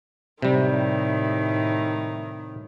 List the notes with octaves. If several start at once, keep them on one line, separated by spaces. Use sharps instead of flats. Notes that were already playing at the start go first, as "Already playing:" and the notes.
A2 C3 D#3 G3